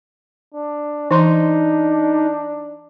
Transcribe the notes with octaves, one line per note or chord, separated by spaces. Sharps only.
D4
E3 D4 D#4 C6